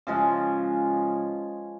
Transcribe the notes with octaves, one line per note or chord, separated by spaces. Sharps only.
C#3 F3 G#3